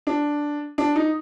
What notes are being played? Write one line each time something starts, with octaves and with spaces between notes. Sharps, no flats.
D4
D4
D#4